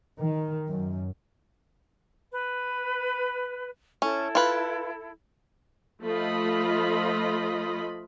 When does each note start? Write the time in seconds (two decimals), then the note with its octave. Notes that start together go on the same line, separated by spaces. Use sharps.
0.19 D#3
0.67 F#2
2.30 B4
4.02 C#4 E4 A4
4.35 F4 B4
6.03 F3 A3 F4 D#5 B5